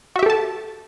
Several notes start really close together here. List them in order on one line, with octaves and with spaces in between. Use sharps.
F#4 E5 G4 A4 A5